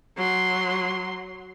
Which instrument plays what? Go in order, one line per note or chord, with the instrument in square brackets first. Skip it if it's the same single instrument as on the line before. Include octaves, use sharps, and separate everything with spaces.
[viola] F#3 C6